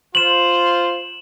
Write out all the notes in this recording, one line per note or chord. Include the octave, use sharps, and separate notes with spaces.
F4 C5 E7 F#7